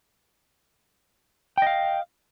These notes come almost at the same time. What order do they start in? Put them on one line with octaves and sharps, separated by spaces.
G5 D#5 F5